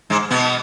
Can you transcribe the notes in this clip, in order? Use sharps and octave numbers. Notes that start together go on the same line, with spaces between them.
G#2 G#3
B2 B3